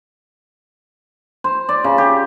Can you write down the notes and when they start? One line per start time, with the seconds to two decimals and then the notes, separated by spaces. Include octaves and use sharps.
1.44 C5
1.69 D5
1.84 C#3
1.98 G4